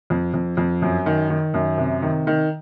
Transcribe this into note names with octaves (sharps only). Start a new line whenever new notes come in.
F2
F2
F2
F#2
D#3
D#3
F#2
C3
D#3
D#3